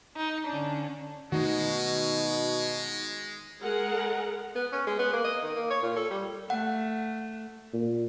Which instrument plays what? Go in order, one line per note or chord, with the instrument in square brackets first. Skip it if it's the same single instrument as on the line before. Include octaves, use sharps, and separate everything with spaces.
[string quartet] D#4
D3 C#4 D4
[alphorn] B2 [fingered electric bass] D#3 A3 [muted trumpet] G#3 [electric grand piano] D#4 F#4
[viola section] G#3 G#4 A#4 F#5
[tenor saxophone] B3
C#4
G#3
B3
A#3
D#5
D#3
A#3
C#5
A#2
A4
G3
[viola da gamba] A3 [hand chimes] F#5
[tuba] A#2